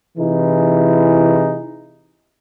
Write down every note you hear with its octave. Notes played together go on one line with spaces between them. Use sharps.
C3 E3 D#4 E4 G#4